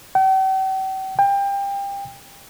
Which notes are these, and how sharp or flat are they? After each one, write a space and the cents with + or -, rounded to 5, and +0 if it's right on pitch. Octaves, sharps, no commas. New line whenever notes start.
G5 -45
G5 +25